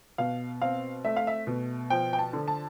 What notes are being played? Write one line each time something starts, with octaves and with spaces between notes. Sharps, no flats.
B2 F5
C4 F5
A3 E5
F5
E5
B2
F3 G5
G5
A5
D3
A5